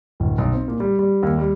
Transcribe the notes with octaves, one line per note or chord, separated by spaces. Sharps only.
D1
B1
C4
A#2
G3
G3
D#2
G3